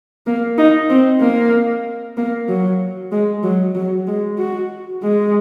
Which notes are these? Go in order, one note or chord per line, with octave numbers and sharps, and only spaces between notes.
A#3
D#4
C4
A#3
A#3
F#3
G#3
F#3
F#3
G#3
F#4
G#3